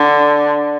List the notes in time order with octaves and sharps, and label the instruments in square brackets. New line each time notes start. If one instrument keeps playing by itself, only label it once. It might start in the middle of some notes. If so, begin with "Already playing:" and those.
Already playing: [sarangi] D3